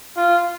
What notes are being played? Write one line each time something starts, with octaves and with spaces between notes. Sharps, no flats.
F4